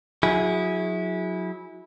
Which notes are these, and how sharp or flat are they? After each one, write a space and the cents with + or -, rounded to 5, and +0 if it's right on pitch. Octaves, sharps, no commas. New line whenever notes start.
F#3 -25 E4 -20 G#4 +0